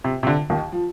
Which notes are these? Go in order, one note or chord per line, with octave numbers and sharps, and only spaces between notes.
C3
C3
D3
D#2 D#3
F3